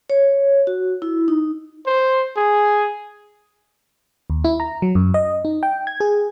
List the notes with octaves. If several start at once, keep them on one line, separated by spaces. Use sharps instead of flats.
C#5
F#4
E4
D#4
C5
G#4
D#2
E4
A#5
F#3
F#2
D#5
D#4
G5
G#6
G#4